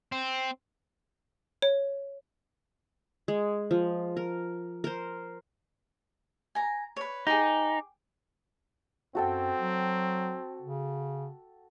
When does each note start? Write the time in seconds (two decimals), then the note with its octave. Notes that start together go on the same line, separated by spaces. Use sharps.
0.12 C4
1.62 C#5
3.28 G#3
3.71 F3
4.17 A#4
4.84 A#4 C5
6.55 G#5 A#5
6.96 B4 C#5
7.27 D#4 G4 G#4
9.15 F#2 C4 F#4 A4 G5
9.58 F#3
10.62 C#3